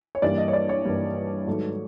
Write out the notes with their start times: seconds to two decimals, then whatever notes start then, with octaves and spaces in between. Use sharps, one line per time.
0.15 C#5
0.22 G2 E3 G3 A#3 D5
0.38 D#5
0.48 C#5
0.53 D5
0.69 C#5
0.84 G2 E3 G3 A#3
1.47 G#2 D#3 F#3 A3